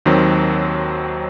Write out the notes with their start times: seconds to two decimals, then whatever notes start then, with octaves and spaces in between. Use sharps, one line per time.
0.06 D#2 D#3 F#3 C4